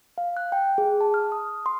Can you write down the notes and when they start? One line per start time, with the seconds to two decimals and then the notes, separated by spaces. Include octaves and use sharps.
0.18 F5
0.37 F#6
0.52 G5
0.78 G#4
1.01 A5
1.14 F6
1.32 D#6
1.66 C6